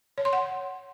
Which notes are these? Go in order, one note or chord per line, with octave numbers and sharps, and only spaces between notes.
C#5
C6
F#5